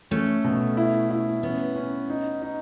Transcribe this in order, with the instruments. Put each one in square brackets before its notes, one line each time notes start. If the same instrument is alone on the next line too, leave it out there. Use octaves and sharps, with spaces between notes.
[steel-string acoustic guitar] A3 [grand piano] C#4
[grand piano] B2
E4
E4
[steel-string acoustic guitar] B3 [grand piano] C#4
[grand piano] C#4
D#4
D#4